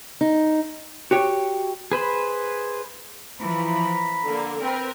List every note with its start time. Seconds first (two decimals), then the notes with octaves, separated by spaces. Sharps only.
0.21 D#4
1.11 F#4 G4 C#5
1.92 G#4 B4 C5 B5
3.40 E3 F3 A#5 B5
4.26 D3 A#3
4.61 C4 A#4 B4